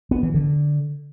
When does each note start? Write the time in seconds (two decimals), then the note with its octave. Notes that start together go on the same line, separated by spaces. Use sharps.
0.11 B3
0.23 E3
0.34 D3